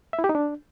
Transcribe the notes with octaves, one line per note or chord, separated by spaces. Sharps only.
E5
E4
G4
D#4
D4